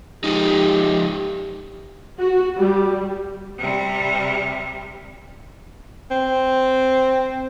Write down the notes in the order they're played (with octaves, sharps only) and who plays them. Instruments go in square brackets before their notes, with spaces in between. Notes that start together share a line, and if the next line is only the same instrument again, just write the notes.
[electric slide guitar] F3 G#3 D#4 [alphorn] G4
[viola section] F#4
G3
[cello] C3 G3
[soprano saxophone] C4